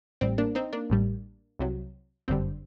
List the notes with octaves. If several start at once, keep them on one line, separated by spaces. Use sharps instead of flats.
A1 A2 G3 C4
A#3 D4
C4 D#4
A#3 D4
A1 A2 G3
C2 C3 F#3
G1 F#2 D3 G3 C4